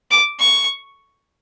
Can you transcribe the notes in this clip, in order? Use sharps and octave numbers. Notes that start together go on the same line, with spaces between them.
D6
C#6